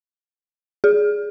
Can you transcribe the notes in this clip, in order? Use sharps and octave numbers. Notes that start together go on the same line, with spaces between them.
G#4